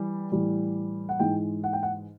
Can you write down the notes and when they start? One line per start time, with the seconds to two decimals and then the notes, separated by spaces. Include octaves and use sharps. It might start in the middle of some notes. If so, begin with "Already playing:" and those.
Already playing: E3 G3
0.32 A2 E3 G3
1.09 F#5
1.19 G#2 E3 G#3 G5
1.64 F#5
1.73 G5
1.83 F#5